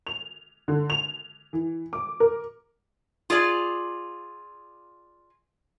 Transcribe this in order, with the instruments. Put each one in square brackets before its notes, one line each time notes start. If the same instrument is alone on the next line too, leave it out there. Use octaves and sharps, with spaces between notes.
[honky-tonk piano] F7
D3
F7
E3
D6
A#4
[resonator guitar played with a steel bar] F4 G#4 D5